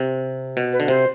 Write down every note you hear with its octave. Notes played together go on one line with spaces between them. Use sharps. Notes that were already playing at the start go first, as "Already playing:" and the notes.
Already playing: C3
B2
B4
D3
C3 C5